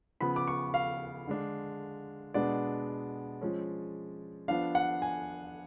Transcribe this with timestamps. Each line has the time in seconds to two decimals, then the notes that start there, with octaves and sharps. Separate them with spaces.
0.21 C#3 F3 B3 B5
0.36 D6
0.48 C#6
0.74 F5
1.28 D3 G#3 D4
2.34 B2 G#3 B3 D4 D5
3.41 F3 G#3 C#4
4.48 F3 B3 D4 F5
4.75 F#5
5.02 G#5